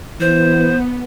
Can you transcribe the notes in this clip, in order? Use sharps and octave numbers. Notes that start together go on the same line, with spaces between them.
E3 B3 C5